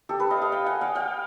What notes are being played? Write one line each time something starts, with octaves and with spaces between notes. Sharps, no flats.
G4 A4
A4 B4
D#5 F5
D#5 F5
F5 G5
F#5 G#5
F5 G5
F5 G5